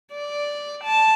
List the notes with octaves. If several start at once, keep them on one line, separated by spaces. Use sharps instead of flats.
D5
A5